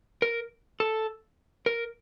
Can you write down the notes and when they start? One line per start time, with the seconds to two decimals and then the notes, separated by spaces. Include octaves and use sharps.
0.22 A#4
0.80 A4
1.66 A#4